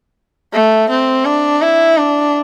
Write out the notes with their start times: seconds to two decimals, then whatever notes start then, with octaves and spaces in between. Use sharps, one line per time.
0.53 A3
0.90 C4
1.25 D4
1.62 E4
1.97 D4